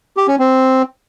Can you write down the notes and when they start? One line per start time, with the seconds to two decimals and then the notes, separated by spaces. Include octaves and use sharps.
0.17 G4
0.28 C#4
0.39 C4